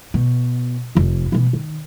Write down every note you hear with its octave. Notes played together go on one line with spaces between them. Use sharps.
B2
F1 F2
B2 E3
D#3